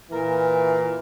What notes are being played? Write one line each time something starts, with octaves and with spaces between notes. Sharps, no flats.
A#2 E3 A#4